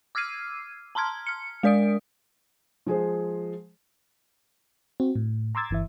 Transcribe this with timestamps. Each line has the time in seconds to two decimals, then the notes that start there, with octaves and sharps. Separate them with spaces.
0.15 D6 E6 F6 G#6 C7 D#7
0.95 A5 A#5 C6 F6 G#6
1.27 F6 C#7
1.63 G#3 A#4 D5 D#6 D7
2.86 F3 G#3 G#4 C5
5.00 C4 F#4
5.16 A2
5.55 A#5 C6 D6 E6 G#6 A6
5.70 G1 E3 E5